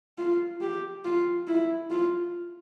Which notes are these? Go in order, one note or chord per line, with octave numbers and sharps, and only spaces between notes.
F4
G4
F4
E4
F4